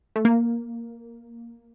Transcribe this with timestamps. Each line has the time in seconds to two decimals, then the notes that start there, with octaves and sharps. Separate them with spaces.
0.16 A3
0.25 A#3